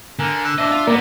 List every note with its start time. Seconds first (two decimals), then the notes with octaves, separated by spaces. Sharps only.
0.19 D3 A#4 G#5
0.45 E6 F#6
0.59 D4 C5 D#5 E5
0.71 F4
0.87 D3 A#3 B3 A#4 D5